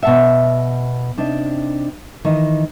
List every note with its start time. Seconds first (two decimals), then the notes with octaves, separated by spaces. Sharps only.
0.03 B2 E5 F#5 A5
1.17 C3 D4 D#4
2.25 D#3 E3 D#5